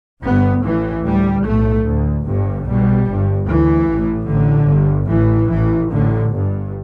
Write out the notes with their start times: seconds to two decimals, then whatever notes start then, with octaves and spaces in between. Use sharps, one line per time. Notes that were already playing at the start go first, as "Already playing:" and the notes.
0.23 G1 G2 B3
0.63 A1 A2 E3
1.04 D2 G3
1.45 B1 A2 A3
1.85 D2
2.26 G1 G2
2.66 B1 B2 G3
3.07 G1 G2
3.47 D2 E3
3.88 A1 A2
4.28 A1 A2 D3
4.69 G1 G2
5.09 A1 A2 E3
5.50 A1 A2 E3
5.90 A1 A2 D3
6.30 G1 G2